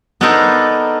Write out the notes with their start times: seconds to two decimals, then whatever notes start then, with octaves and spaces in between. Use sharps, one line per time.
0.21 B3 D4 D#4 A4 A#4 C5